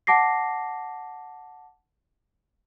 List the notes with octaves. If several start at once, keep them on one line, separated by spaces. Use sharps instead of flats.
F#5 A5 D6 A#6 C7